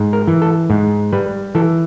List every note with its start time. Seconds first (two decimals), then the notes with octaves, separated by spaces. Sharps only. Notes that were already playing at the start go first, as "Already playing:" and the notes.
Already playing: G#2
0.13 A#4
0.27 E3
0.42 A4
0.70 G#2
1.13 G3 B4
1.55 E3 A4